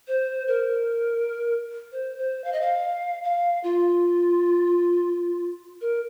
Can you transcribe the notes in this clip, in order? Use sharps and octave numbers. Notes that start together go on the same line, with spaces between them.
C5
A#4
C5
C5
F5
D#5
F5
F5
F4
A#4